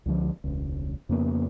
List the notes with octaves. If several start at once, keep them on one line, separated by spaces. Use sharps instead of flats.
C#2 D3 F3
E1 C#2
F2 C#3 A#3 B3